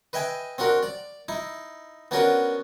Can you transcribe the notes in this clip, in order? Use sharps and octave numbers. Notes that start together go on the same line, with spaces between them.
B4 D#5 E5 G5 G#5
C4 D4 F#4 A#4
D5
D#4 E4
B3 C#4 D4 F#4 A#4 B4